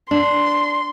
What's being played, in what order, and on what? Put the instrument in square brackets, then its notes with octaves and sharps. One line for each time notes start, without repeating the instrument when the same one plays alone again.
[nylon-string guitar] D4 [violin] C6